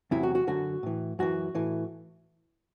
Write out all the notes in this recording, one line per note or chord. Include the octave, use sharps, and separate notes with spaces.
E2 C3 F#3 E4
F#4
F#4
F#2 D3 F#3 F#4
A2 E3
F#2 E3 F#4
A2 E3